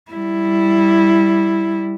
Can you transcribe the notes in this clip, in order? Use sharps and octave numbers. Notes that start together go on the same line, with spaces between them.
G3 E4